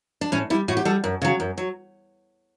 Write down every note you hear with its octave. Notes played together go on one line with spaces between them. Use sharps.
D4
A2 C#4
G3 E4
A2 F#4
G4
G3 A4
F#2
C#3 F#3
F#2
F#3